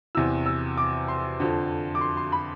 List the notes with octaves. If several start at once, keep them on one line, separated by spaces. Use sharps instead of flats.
E2 C3 E3 E6
E6
D6
C6
F2 D3 F3
D6
C6
C6
B5